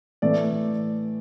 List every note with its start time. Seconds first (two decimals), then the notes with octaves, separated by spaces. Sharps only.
0.22 A2 E3 A3 D5